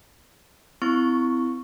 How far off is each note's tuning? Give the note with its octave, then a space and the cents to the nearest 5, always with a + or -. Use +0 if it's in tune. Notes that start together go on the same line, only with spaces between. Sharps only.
C4 -35 E4 +0 C#6 +0